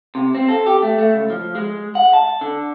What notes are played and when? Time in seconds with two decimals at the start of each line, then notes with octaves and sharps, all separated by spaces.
0.15 C3
0.35 C4
0.48 A4
0.66 G4
0.82 A3
0.98 A3
1.13 C#2
1.30 F3
1.55 G#3
1.95 F#5
2.13 A5
2.41 D3